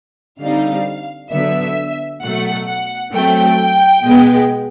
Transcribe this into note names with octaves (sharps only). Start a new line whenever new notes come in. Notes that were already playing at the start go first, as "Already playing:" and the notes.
D3 G3 C4 D#4 F5
D3 F#3 B3 E5
B2 F#3 A3 F#5
F#5
F#3 A3 C4 G5
B2 G#3 B3